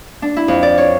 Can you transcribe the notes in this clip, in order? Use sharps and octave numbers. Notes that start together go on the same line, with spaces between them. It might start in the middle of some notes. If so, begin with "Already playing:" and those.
D4
E4
F2
D5
C#5